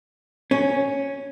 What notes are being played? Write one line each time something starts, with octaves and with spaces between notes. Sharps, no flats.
C#4